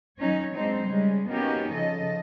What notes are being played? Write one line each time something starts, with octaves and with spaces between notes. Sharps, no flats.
D#3 F#3 C#4 D#4 C#5
F#3 G#3 C4 D4 D#4 C5
C#3 G3 G#3 C#4
A#3 B3 C#4 D#4 F#4 G4
C#3 F3 A4 D#5